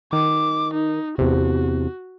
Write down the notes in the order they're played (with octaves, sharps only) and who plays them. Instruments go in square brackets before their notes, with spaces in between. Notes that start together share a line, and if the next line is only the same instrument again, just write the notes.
[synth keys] D#3 [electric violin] D6
[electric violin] D#4
[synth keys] E2 C3 [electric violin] F#4